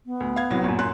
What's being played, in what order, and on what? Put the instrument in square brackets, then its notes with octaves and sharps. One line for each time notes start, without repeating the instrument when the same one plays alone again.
[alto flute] B3
[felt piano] D2
F5 G#6
C2 F#3
A#1 F#2
F#2 C6 F#6